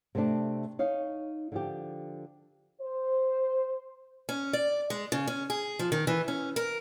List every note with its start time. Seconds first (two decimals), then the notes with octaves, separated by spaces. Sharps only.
0.15 C3 A3 C4 D4 A4
0.79 D#4 C#5 F5
1.52 D3 F3 G4
2.82 C5
4.29 C#4
4.53 D5
4.90 G#3
5.12 C#3
5.28 C#4
5.50 G#4
5.79 F3
5.92 D#3
6.07 E3
6.28 C#4
6.56 A#4